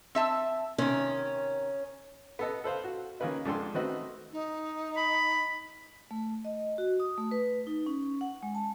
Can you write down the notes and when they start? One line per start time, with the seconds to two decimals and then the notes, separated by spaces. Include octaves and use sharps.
0.15 C4 E5 A5
0.78 C3 D#3 C#4
2.39 B3 A4 D#5
2.64 A4 B4 C5 F5
2.84 F#4
3.20 D#3 A#3 C#4 F4 B4 D#5
3.45 F2 G#2 D4 A4 G5 C6
3.74 D#3 A3 C4 F#4 B4 D#5
4.32 D#4
4.97 B5
6.11 A3
6.45 D#5
6.78 F#4
7.00 D#6
7.18 A3
7.31 B4
7.67 D#4
7.86 C#4
8.21 F#5
8.43 G#3
8.55 A5